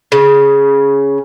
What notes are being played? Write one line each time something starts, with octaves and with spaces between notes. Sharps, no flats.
C#3